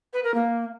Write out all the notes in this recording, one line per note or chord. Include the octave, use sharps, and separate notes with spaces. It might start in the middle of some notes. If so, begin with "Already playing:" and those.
B4
A#4
A#3